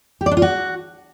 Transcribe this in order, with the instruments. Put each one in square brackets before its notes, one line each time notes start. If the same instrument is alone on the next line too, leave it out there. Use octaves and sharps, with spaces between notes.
[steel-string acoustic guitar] G4
D5
D4
F4
F#4